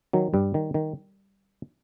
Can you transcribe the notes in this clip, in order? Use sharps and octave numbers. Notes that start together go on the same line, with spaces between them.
D#3 F#3
G2 G3
D#3
D#3